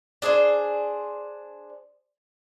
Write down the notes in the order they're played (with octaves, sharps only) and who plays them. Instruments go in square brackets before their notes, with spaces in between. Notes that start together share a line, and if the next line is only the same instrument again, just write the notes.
[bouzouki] D4 G#4 A#4 C5